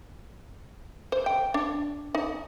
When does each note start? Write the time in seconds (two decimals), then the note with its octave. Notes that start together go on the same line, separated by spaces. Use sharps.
1.12 C5
1.26 G5
1.54 D4
2.15 D#4